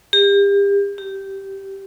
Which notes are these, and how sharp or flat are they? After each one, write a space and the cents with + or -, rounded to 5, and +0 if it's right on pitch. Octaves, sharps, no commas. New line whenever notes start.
G4 +35
G4 -10